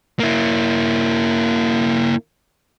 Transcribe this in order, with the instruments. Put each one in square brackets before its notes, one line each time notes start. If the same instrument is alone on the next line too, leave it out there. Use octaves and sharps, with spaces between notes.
[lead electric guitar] A#3 E4